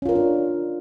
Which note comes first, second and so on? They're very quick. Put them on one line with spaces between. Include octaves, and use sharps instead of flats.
C#4 F4 A#4 C#5 D4